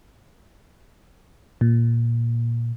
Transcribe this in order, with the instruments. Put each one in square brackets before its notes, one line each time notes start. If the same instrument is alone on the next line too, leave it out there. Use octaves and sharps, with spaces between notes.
[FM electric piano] A#2